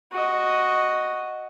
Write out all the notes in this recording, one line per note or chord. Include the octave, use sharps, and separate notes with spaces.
F#4 D#5